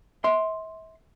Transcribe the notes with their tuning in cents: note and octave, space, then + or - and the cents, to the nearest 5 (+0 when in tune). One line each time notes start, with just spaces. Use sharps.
E5 -35 C6 +5